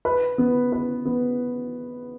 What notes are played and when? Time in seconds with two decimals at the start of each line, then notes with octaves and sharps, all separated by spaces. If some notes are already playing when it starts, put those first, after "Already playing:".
0.05 B4
0.38 B3
0.72 B4
1.05 B3